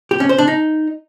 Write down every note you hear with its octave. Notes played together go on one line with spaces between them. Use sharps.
G4
C#4
C5
D4
D#4